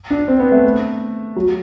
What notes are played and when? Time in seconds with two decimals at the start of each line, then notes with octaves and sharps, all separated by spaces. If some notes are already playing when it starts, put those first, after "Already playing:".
0.10 D4
0.28 C4
0.40 B3
0.52 A3
1.36 F#3